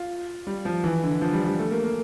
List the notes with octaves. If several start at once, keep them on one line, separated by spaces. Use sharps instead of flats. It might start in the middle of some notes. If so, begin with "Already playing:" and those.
Already playing: F4
G3
F3
E3
D3
F3
G3
G3
A3
A#3
A#3